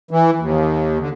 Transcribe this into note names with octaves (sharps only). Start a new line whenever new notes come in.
E3
D#2
D3